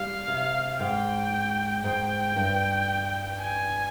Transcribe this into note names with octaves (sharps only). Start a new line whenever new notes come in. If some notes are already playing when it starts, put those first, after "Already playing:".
Already playing: G3 F5
C3
G#2 G5
G#2 G5
G2
G#5